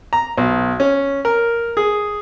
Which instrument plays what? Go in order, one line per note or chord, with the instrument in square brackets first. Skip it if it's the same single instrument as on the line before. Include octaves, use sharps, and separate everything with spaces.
[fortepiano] A#5
B1
C#4
A#4
G#4